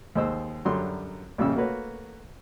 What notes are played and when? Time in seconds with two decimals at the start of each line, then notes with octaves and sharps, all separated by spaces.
0.15 D#2 G#3 C5 E6
0.65 F#2 D3 F#3 G3 C6
1.38 A#1 F2 C#3 G3 C#4 E6
1.56 A3 A#3 F#4 B4 C#5